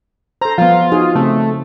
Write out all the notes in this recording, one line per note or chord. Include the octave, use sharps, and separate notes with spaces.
A4 C5 A#5
F3 G3 B3 F4
D#4 F#4 G#4
C#3 A3 C4 G#4